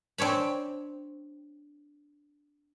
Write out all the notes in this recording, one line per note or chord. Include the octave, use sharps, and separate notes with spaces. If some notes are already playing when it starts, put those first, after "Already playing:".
C4 D4 C#5 B5